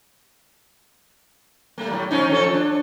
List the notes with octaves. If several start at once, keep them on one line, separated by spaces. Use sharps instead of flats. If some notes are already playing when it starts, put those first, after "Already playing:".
G3 A3 A#3
A2 F#3
F3 C#4 D#4
F3 A4 C#5
D4